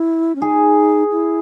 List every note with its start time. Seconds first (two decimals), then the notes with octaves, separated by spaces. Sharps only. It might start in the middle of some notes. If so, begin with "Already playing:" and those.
Already playing: E4
0.35 C#4
0.41 D#4 G#4
1.11 E4